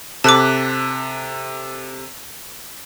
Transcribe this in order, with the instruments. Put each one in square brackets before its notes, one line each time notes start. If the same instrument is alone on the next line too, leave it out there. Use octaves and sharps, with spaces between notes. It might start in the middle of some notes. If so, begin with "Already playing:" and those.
[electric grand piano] C3 A4 F#6 [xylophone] A5 D6